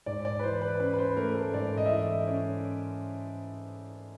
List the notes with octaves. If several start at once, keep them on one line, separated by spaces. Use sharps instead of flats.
G#2 D5
D5
B4
E3 C5
B4
C#4 B4
B4
C5
A3 A#4
A4
G#2 D5
D#5
E5
E3 D#5
C#4